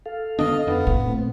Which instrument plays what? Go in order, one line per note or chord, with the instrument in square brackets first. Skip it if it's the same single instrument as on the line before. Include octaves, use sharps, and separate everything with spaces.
[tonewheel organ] A4 F5
[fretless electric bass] D3 B3 D4 [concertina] D#5
[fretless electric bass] F2 D4 [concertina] B3
[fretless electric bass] A2 [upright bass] E4
[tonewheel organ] A#2 A3 C4